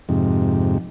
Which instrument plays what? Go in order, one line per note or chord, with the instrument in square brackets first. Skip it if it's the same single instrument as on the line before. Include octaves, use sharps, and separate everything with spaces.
[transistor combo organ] F2 G#2 C3